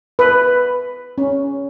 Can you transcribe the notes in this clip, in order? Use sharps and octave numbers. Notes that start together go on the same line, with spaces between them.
B4
C#4